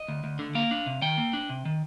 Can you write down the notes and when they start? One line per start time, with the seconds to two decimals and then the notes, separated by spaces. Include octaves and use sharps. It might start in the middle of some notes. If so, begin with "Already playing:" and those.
Already playing: D#5
0.08 D2
0.24 D2
0.39 D3
0.55 A#3 F5
0.71 D4
0.86 C3
1.02 D#3 G5
1.17 A#3
1.33 D4
1.50 C3
1.65 D#3